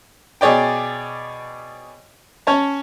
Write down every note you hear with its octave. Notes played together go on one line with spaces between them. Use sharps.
B2 G#4 C#5 D5 G5
C#4 C#5 A5